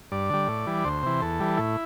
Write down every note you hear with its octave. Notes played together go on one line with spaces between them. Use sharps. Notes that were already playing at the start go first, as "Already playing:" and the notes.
G2 D5
D3 G3
A2
E3 G3
D2 C5
C3 E3
E2 A4
E3 G3
A2 E4